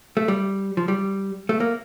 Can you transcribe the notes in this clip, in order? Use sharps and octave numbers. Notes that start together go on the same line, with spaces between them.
A3
G3
F3
G3
A3
A#3